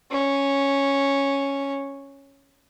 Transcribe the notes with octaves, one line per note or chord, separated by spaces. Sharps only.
C#4